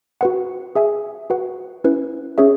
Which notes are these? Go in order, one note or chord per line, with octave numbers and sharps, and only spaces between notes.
F#4 B4 F#5
G#4 E5 G#5
F#4 B4 F#5
C#4 E4 B4
C#4 G#4 C#5 E5